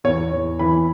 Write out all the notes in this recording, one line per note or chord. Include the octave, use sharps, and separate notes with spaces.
E2 C#5
E2
E3 B5